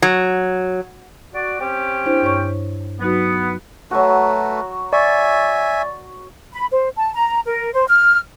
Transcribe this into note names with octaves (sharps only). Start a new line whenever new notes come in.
F#3
F#4 D5
C4 C#4 G4
D4 E4 C5
G2 C#5 C#6
F#3 B3 D#4 F#4
F#3 A3 F#4 B4
D5 E5 G#5 C#6
B5
C5
A5
A#5
A#4
C5
F6